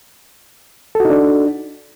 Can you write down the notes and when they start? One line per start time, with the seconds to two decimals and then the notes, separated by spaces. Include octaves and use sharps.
0.95 A4
1.00 F#4
1.05 D#4
1.10 D4